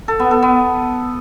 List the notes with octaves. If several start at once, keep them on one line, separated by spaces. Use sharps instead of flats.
A4
B3
A4
B3